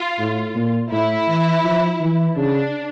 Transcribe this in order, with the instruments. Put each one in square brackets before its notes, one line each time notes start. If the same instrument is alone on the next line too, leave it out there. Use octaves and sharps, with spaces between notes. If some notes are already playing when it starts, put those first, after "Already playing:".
Already playing: [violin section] F4
[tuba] A2
A#2
[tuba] A2 [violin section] E4
[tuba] E3
F3
E3
[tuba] C#3 [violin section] D4